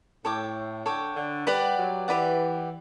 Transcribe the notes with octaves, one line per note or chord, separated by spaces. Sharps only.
A2 A4 C#5 G5 D6
D3 A4 C#5 G5 D6
D3
G3 G4 B4 D5 F#5
F#3
E3 G4 B4 D5 F#5